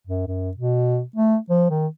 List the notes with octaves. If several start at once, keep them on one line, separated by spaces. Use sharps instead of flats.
F#2
F#2
B2
A3
F3
D#3